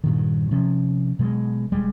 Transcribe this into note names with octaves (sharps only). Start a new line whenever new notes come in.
G2 A#2 D#3
C3 F3 C#4
B2 F#3 G#3
E1 G3 G#3